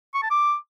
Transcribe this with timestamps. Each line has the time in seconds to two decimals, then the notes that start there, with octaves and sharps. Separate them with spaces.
0.14 C#6
0.23 A5
0.31 D6